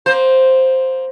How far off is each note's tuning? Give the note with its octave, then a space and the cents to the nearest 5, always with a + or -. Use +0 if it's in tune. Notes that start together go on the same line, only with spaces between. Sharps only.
A#3 +25 C5 +0